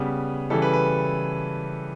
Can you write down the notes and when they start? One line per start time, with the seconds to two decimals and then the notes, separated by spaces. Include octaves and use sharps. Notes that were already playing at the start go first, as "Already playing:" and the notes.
Already playing: C#3 G3 B3 B4
0.50 C#3 E3 G3 A4
0.62 B4
0.73 B4